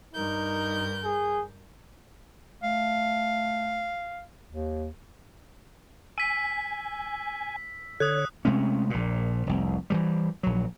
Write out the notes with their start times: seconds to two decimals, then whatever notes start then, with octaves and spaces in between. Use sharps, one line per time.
0.13 G2 D#4 A#4 G6
1.04 G#4
2.63 A3 F5
4.49 D#2
6.18 G#5 E6 B6
8.00 D3 C#5 D#6 F#6
8.45 C3 G#3 A3 C#4
8.90 A#1 A#2
9.47 F1 C2
9.90 E3 F3 G3
10.43 A#1 F#3